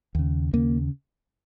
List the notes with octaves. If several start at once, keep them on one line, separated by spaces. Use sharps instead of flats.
D#2 C#3
D#2 C#3 A#3